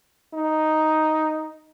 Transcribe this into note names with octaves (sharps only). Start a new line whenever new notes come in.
D#4